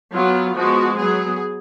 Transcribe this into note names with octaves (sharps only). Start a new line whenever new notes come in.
F#3 B3 F4
F3 G#3 B3 F#4
F#3 B3 G#4